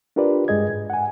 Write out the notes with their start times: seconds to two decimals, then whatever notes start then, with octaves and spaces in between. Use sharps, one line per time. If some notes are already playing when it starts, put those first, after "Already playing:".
0.16 D4 F4 G4 A#4 B4 D5
0.48 G2 G#3 G#4 D#5 G#6
0.70 G#2
0.90 F#5 G#5